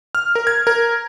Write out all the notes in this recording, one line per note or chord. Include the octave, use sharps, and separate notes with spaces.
F6
A#4
G#6
A#4